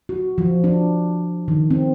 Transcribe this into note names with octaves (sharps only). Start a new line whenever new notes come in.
F#4
F3
D4
D#3
C4